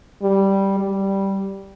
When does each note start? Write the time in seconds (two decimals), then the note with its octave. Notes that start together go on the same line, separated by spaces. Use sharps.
0.22 G3
0.79 G3